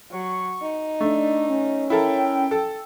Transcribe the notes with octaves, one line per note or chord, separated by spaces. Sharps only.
F#3 C#6
D#4
A3 D4
C#4
E4 A4 A#4 G5
A4